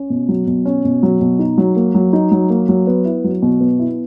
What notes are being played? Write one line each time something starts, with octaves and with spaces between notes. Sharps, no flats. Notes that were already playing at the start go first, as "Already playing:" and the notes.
Already playing: C#4
B2
F#3
B2
C#4
B2
F#3
B2
D#4
F#3
A#3
F#3
D#4
F#3
A#3
F#3
B3
E4
F#3
B2
B3
E4